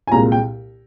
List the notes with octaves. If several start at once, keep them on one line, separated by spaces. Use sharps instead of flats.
G#5
C2 A#2 G#3 A#5
G5